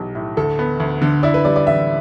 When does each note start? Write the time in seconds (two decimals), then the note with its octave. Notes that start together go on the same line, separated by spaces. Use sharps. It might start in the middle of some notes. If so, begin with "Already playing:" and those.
Already playing: B1 E3 G4
0.15 A2
0.37 D2 A4
0.59 B3
0.80 D2
1.02 D3
1.23 E4 D5
1.34 B4
1.45 G3 D5
1.56 D5
1.66 A1 E5